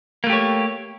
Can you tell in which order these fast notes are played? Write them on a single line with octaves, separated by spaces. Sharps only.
A#3 A3 G4 C#5